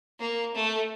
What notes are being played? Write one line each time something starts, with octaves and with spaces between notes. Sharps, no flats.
A#3
A3